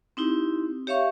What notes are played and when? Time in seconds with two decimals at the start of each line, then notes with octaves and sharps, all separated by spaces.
0.17 C4 D#4 E4 G4
0.87 G4 C#5 E5 F5 C#6